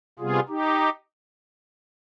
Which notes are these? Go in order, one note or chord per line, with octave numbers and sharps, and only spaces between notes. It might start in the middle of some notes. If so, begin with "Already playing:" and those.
C3 G3 B3 F4 G#4
D#4 G4